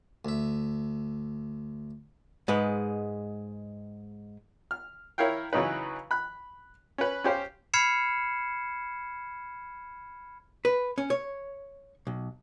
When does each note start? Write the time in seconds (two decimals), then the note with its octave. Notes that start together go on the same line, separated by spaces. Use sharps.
0.25 D2 E5
2.48 G#2 G#3 B4
4.71 F6
5.18 E4 A#4 C#5 F5 G5
5.53 C#3 E3 F#3 D#4 B4
6.11 B5 F#6
6.98 C#4 B4
7.24 C#4 G4 C5 F5
7.74 B5 F6 G#6 C7 C#7 E7
10.65 B4
10.98 C#4
11.10 C#5
12.07 B1